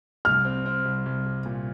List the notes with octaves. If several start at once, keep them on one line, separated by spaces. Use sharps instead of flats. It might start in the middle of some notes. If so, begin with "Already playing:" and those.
C2 F6
C4
C4
C2
C2
C2
A#2